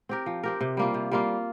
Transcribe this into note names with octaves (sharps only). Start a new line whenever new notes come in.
C4 G4 A#4
F3
C4 G4 A#4
C3
G3 A#3 F4
C3
G3 A#3 F4